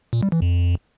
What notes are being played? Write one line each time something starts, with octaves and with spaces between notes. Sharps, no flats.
A#2
G3
E3
F2